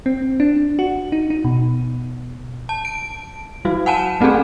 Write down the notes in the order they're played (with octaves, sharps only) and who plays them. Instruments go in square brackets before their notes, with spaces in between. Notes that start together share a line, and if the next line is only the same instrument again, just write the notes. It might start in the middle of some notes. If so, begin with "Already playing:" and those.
[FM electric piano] C4
D4
F#4
D#4
D#4
B2
[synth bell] A5
D7
F#3 F#4
F#5 G#5 A5 D#7 E7
A3 C4 C#4 G#4 A4